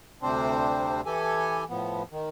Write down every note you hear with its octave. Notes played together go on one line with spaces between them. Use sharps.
D2 C3 G3 C4 D4 C5
E3 G4 A4 G#5
A2 F3 B3
D#3